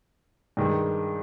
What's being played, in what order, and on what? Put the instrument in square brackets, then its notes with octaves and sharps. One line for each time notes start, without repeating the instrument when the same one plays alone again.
[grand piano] G2 D#3 G#3